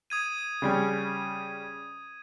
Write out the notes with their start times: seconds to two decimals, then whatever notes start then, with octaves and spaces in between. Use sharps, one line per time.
0.10 D#6 G#6 D#7
0.62 C#3 G3 C#4